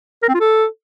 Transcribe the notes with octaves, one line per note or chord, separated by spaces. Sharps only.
A#4
C4
F4
A4